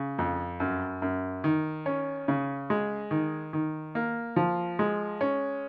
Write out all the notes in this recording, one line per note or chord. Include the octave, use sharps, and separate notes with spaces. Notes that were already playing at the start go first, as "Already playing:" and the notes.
Already playing: C#3
F2
F#2
F#2
D#3
C#4
C#3
G#3
D#3
D#3
A#3
F3
G#3
C#4